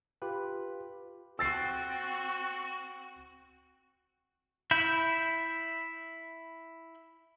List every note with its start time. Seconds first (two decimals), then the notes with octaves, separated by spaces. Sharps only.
0.22 F4 G4 B4
1.39 C4 F#4 E6 A6 C7
4.71 E4 E5 B5 G6